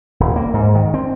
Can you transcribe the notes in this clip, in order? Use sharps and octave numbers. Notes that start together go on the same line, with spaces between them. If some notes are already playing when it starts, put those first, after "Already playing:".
D#1
A#3
G#2
D#3
C4